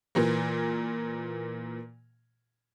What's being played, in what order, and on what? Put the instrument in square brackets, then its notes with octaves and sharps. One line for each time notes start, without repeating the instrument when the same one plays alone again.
[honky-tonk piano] A#2 E3 A#3